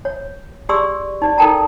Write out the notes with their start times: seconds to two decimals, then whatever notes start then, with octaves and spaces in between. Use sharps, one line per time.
0.05 C#5
0.69 G4 G#4 D5 C6 C#6 E6
1.22 D#4 D5
1.38 D#4 A4 A#4 G5 A5 A#5